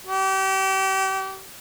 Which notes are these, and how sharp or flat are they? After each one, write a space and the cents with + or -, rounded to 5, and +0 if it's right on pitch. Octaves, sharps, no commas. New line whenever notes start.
G4 -35